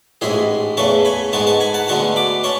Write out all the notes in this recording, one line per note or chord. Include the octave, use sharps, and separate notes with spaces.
A1 G#2 G#3 E4 G#4
E2 C#3 E3 A3 A5 C#6
G#5 B5
G#2 G#3 B3 A5 C#6
A5 C#6
G#5 B5
F#5 A5
D2 D3 G#3 B3 A5 C#6
B5 D6
C#4 A5 C#6